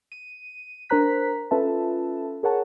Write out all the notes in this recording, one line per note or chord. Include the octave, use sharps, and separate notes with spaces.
D#7
D4 A#4 C5 A#5 F#6 B6
C#4 F4 A4 B4 E5 A5
G#4 A#4 C#5 F#5 A5